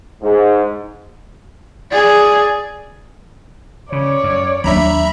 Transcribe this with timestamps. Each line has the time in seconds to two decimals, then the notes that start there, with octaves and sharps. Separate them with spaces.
0.23 G#2
1.91 G#4 D5
3.92 C#3 C#5 D5
4.24 F#2
4.64 D#2 F#3 A#3 D4 E5 A#5 B5